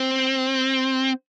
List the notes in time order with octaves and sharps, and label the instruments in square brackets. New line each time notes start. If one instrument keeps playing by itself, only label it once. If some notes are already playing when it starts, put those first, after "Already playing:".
Already playing: [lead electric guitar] C4